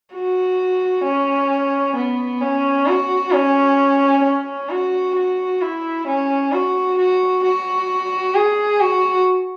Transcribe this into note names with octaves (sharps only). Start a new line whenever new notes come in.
F#4
C#4
B3
C#4
F#4
C#4
C#4
F#4
F#4
E4
C#4
F#4
F#4
F#4
G#4
F#4